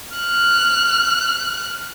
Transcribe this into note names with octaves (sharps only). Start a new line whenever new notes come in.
F6 F#6